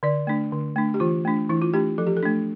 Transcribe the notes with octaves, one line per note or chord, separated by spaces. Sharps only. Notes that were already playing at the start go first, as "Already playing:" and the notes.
D3 D5
A3 D4
D3
A3 D4
G4
E3 F4
A3 D4
E3 E4
F4
A3 D4 G4
F3 A4
G4
A4
A3 D4